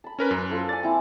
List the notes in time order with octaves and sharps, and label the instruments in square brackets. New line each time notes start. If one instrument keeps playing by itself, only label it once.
[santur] A5 B5
[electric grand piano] C#4 A#4 B4
[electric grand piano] F#2 [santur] B4
[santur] F4 A4 C5
[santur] D5 G#5 [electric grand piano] A6
[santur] C4 E4 A5